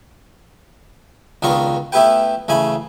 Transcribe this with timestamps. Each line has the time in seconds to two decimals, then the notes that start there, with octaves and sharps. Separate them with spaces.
1.42 C#2 B2 D#3 D4 F4 C#6
1.92 A3 B3 E4 G4 B4 G5
2.48 A1 C#3 A3 G#5 B5